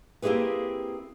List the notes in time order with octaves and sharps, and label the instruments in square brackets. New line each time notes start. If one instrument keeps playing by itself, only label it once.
[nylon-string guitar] A#3 C4 E4 G4 G#4 B4